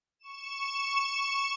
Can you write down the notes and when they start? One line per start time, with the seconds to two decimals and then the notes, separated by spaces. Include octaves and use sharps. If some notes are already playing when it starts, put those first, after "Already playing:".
0.19 C#6 E7